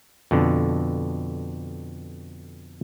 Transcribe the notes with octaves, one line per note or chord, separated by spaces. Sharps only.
F2 B2 D3